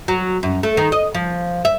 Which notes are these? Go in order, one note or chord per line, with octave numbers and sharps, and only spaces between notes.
F#3
F#2
A3
D#3
D#5
F3
E5